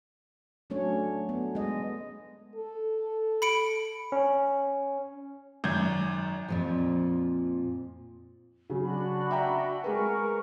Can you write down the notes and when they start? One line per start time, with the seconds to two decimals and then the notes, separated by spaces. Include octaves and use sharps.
0.70 F#3 A3 C#4 D4 C#5
1.29 B3
1.55 G#3 D#5
2.56 A4
3.42 B5 C#7 D7
4.12 C#4
5.64 G#1 F#2 G6 G#6
6.48 F2 A#2 F3
8.70 C#3 F#3
8.82 D4 F#4 B5
9.31 E5 G5 A#5
9.84 G#3 G#4 A#4 B4 C#6